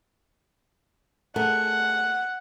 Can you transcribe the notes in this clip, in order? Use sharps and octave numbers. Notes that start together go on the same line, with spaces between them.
A3 G#4 A#4 F#5